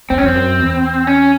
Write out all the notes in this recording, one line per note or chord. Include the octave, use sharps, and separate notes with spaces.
F2 C4
C#4
F2 C4
F#2
E2
C#4